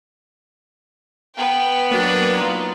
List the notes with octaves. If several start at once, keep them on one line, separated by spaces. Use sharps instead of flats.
B3 B4 G5
F#3 A#3 D4
D#4 F4